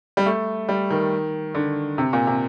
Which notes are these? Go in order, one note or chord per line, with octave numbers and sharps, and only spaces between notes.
G3
A3
G3
D#3
D3
C3
A#2
C3